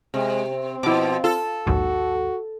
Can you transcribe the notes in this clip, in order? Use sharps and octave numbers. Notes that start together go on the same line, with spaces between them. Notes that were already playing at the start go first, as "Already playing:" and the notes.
C3 G#3
C4
B2 F3 E4 D6
F4 A4
A#1 D#2 G#2 F#4